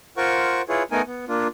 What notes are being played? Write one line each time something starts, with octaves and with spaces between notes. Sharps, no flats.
F4 A#4 C5 F#5 C#6
E4 F4 G#4 B4 C#5
A3 B3 D#4 A#4 G#5
B3
A#3 D4 F4